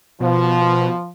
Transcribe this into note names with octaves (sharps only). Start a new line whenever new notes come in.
B2 F3